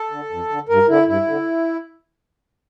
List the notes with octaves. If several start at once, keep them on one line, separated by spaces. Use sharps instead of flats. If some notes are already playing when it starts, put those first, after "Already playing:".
Already playing: A4
D3
F2
D3
G2 A#4
D3 E4
G2 E4
D3